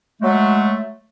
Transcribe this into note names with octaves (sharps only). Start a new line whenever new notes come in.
F#3 G#3 A3